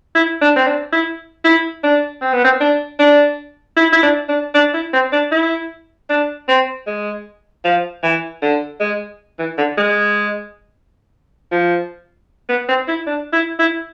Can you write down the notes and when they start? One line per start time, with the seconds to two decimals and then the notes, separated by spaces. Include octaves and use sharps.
0.15 E4
0.41 D4
0.56 C4
0.67 D4
0.93 E4
1.44 E4
1.84 D4
2.21 C4
2.33 B3
2.44 C4
2.60 D4
2.99 D4
3.77 E4
3.93 E4
4.03 D4
4.28 D4
4.54 D4
4.74 E4
4.93 C4
5.12 D4
5.32 E4
6.09 D4
6.48 C4
6.87 G#3
7.65 F3
8.03 E3
8.42 D3
8.80 G#3
9.39 E3
9.58 D3
9.78 G#3
11.51 F3
12.49 B3
12.68 C4
12.88 E4
13.07 D4
13.33 E4
13.59 E4